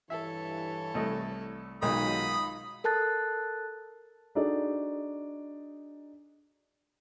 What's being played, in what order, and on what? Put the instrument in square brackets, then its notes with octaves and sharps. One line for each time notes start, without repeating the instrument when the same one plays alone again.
[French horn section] G2 E3 [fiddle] A4 C#5 [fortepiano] E5
[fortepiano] C2 A3 D#5
[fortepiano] B1 D#3 G#3 [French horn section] F#3 [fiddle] D#4 F4 [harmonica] B5 D#6
[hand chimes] A4 A#4 A5 F#6 A6
[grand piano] D4 D#4 F#4 G#4 A4 D5